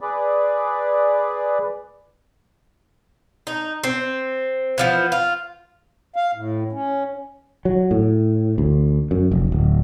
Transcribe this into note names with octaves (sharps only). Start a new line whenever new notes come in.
G#4 B4 D5
D#4
C4
E3 F3 B3
F4
F5
A2
C#4
F#3
A2
D2
F#2
F1
D1